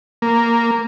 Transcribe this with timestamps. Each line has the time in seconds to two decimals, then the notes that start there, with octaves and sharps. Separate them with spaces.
0.22 A#3